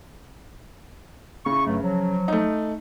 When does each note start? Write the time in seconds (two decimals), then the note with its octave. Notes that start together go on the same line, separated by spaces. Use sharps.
1.46 C#3 E4 C#6
1.67 G2 F#3 A3
1.83 F3 F#3
2.28 A3 D#4